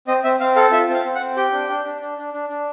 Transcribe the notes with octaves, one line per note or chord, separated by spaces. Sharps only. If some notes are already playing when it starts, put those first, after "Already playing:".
C4 D#5
C4 E5
C4 F5
A4 F5
F4 E5
C4 F5
C4
F#5
C4
G4 G5
D4
D4
D4
D4
D4
D4
D4